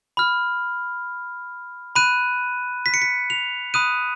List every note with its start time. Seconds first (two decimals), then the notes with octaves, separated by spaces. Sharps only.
0.17 B5 F6
1.95 B5 F#6 D#7
2.86 B6
2.94 C#7
3.02 B6
3.30 F7
3.74 B5 D#6 F#6 D#7